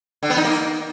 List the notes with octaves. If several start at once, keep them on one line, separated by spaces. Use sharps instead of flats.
D3
B3
D#4
A#3